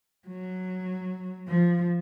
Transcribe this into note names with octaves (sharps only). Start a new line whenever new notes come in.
F#3
F3